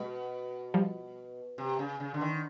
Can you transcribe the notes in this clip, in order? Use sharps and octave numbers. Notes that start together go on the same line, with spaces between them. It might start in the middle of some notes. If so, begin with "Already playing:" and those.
Already playing: B2 G#3
F3 G3
C3
C#3
C#3
D3
D#3